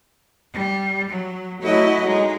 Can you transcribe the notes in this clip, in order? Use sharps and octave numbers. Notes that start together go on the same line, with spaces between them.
G3
F#3
F#3 A3 E4 F#4 D#5
G#3 D#4